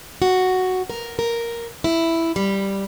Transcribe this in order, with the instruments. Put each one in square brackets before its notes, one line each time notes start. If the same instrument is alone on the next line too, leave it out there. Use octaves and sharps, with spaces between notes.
[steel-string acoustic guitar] F#4
A#4
A#4
E4
G3